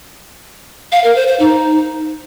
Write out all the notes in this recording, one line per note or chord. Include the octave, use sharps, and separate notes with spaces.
F5
A#4
C5
C5
D#4